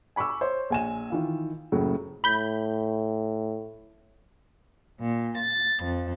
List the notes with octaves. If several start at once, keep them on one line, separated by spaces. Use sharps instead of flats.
G#5 B5 C#6 D6 E6
C5 C#5
A#1 G#5 E7
D#3 E3 F4
F#1 A2 C#3 F#3
A2 B5 G6
A#2
A6
F2